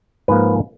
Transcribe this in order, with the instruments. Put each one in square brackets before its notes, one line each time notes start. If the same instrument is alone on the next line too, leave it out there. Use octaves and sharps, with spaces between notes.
[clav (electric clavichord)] G#2 F3 A#3 B4